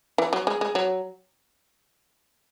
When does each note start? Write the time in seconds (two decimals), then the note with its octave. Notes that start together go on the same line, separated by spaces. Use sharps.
0.18 E3
0.33 F#3
0.47 G#3
0.61 G#3
0.75 F#3